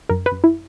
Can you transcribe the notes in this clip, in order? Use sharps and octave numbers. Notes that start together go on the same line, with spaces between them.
F#2 A#4
B4
F#2
E4